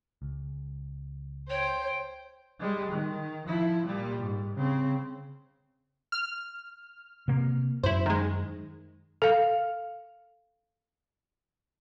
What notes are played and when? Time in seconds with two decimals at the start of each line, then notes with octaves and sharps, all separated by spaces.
0.22 C#2
1.50 C5 C#5 G5
2.60 G3 G#3
2.92 D#3
3.47 F3 E4
3.86 A#2 G3
4.22 G#2
4.55 C#3 C4
6.12 F6
7.28 C3 A#3
7.83 F#2 E4 C5
8.06 D#3 G#3
9.22 A4 F5